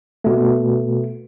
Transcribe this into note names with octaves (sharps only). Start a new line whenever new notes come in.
B2 A3